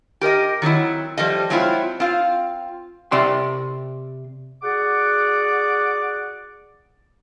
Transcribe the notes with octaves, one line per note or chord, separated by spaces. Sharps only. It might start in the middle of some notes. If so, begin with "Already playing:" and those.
G4 A#4 D5 D#5
D#3 F#3 C4 E4
F3 G3 A3 D#5
F#3 G#3 C4 E4 F4
C4 F4 F5
C3 D5 C6
F#4 G#4 D5 F#5 D6